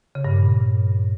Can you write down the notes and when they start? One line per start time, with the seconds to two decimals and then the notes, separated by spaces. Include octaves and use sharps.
0.15 C#3
0.25 G2
0.34 A#2